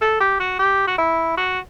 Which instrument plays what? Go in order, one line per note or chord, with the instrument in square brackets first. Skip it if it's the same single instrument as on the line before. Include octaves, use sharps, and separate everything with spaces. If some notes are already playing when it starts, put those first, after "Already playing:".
[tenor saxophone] A4
G4
F#4
G4
F#4
E4
F#4